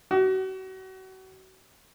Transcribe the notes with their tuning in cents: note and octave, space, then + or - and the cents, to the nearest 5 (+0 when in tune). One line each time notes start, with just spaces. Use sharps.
F#4 +35